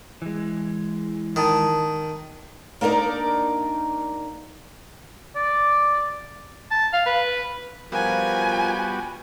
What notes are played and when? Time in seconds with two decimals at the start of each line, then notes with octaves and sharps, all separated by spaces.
0.22 E3 G#3
1.36 D#3 A5 A#5 D#6
2.81 A#3 D4 D#4 A#4 D5
5.35 D5
6.71 A5
6.93 F5
7.06 B4
7.92 F3 G3 B3 F4 F#4 A#4 G#5